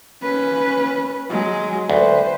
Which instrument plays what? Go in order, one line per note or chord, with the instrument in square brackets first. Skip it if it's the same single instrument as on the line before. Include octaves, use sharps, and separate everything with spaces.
[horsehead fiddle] C#4 B4
F#3 G#3
[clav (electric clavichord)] D2 [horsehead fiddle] B4 C5